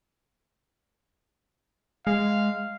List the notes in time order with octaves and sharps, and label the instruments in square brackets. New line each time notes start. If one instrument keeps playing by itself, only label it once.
[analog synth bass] G#3 [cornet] F5